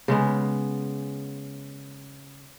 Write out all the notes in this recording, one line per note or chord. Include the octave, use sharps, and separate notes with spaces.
C#3 G#3 B3